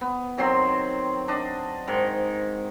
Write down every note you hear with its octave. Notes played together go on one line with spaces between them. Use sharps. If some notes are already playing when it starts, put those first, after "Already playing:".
B3
D#3 F#3 C4 C6
D4 D#5
G#2 D#3